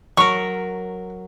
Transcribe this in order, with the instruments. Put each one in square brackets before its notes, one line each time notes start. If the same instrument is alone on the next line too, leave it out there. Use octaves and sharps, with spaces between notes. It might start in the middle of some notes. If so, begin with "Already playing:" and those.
[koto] F#3 A#4 [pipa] C#6